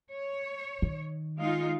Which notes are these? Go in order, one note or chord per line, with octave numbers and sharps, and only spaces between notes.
C#5
D#3
G#3 D#4 F4